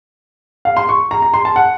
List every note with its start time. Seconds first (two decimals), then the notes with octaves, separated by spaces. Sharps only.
0.65 F5
0.77 C6
0.89 C#6
1.11 A#5
1.22 A#5
1.34 C6
1.45 A5
1.56 F#5